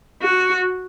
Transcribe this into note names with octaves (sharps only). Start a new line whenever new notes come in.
F#4